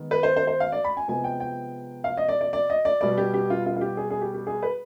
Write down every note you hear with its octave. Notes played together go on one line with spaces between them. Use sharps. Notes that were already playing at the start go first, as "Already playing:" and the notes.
Already playing: D#3 G#3 B3
B4
C5
C5
C5
F5
D5
B5
G#5
C3 F3 G#3 B3 G#5
G5
G5
F5
D#5
D5
D5
D5
D#5
D5
B2 G3 B3 D5
G4
G4
F4
F4
F4
G4
G#4
G#4
G4
G4
G#4
B4